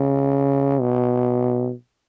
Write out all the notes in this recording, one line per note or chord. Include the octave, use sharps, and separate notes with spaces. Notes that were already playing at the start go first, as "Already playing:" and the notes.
Already playing: C#3
B2